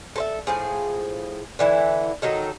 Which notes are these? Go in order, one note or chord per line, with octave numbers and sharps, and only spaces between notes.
A4 C5 E5
A2 F3 G#4
D3 E3 E4 E5
D#3 F#3 D#4 A4